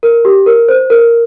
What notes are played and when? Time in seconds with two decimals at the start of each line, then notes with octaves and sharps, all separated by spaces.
0.03 A#4
0.25 G4
0.46 A#4
0.69 C5
0.90 A#4